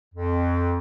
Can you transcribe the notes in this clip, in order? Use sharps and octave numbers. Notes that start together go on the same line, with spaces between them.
F2